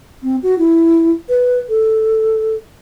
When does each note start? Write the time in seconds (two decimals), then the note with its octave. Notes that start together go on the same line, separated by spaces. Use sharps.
0.23 C4
0.43 F#4
0.59 E4
1.29 B4
1.69 A4